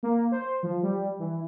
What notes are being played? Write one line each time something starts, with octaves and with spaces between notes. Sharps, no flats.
A#3
C5
F3
G3
E3